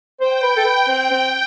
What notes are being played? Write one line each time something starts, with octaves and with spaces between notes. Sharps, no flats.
C5 G5
B4
A4
B4
C4
C4